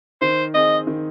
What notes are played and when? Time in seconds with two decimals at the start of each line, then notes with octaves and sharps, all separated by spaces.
0.21 D#3 C5
0.54 C4 G#4 D#5
0.87 D#3